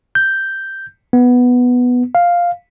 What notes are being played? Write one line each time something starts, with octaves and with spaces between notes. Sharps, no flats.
G6
B3
F5